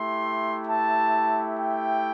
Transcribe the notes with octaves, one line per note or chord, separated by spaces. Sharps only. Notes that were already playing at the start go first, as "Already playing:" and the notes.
Already playing: A3 E4 G4 C6
A5
G5